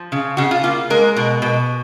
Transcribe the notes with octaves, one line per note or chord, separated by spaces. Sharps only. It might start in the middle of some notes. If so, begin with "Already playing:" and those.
Already playing: F3
C#3
C#3 F#4
F4
A#3 F4
G#3 A#4
B2
B2